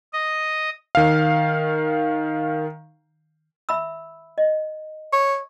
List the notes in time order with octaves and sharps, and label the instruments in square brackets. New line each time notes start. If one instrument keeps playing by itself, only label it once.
[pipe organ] D#5
[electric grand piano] D#3 F5
[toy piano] E5 B5 E6
D#5
[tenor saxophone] C#5